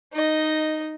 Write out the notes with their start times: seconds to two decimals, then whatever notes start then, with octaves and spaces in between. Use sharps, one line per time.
0.13 D#4 D#5